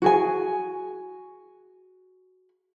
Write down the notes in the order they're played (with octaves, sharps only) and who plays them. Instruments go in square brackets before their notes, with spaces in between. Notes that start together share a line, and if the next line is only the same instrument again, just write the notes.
[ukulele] F#4 G#4 G#5